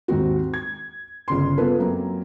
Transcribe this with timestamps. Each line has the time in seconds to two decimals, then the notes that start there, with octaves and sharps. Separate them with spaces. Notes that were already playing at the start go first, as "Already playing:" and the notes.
0.08 D#2 G#2 C4 F#4
0.54 G#6
1.28 G1 C#3 C6
1.58 B3 F4 A4 B4
1.79 F#2 A#3 C4